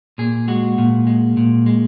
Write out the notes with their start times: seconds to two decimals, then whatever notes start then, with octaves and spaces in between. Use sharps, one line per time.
0.18 A#2 G#4
0.48 G#3 F#4
0.78 A#2
1.07 G#3
1.37 A#2
1.66 G#3